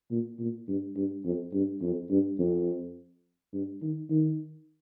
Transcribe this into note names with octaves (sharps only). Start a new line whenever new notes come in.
A#2
A#2
G2
G2
F2
G2
F2
G2
F2
G2
D#3
D#3